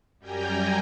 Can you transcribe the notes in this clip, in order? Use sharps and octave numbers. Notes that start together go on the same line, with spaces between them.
F#2 G3 G5 G#5 A#5